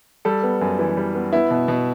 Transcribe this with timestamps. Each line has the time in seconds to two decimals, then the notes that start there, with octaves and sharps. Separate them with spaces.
0.25 G3 A4
0.43 B3
0.61 F#2
0.79 E3
0.97 G3
1.15 B3
1.33 B3 E4
1.51 B2
1.68 B2